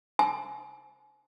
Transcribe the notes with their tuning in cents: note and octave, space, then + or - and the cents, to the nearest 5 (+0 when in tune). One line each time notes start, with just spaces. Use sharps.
G#5 +40